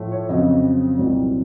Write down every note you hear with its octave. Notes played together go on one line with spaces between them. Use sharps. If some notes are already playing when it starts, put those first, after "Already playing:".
Already playing: A2 F3 A3
C#5
F2 C#3 F#3 C4 D#5
C2 A#2 F#3 C4